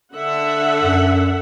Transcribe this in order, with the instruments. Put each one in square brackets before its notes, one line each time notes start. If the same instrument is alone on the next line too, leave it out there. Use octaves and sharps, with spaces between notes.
[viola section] D3 E5 F#5
[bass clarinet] F#2